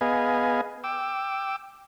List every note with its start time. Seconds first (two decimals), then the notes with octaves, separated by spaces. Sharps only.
0.01 B3 G#4 B4 D#5 F5 G#5
0.84 G5 D6 E6